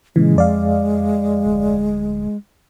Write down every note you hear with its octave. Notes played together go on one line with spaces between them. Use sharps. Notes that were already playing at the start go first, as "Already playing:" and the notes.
A#2 C#3 E3 G#3
F2 D5 F5
D1